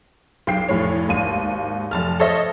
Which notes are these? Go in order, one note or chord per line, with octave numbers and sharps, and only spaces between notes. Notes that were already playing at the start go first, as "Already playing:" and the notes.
B1 G5 C7
F1 A2 C#5
G#1 D#2 D#7
F1 A5 F6
A4 C5 C#5 D#5 E5